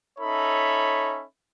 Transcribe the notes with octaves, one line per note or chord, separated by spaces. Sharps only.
C#4 D#4 A4 C#5 E5 B5